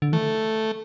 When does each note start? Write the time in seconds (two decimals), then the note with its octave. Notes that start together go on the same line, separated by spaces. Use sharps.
0.02 D3
0.12 E3 A3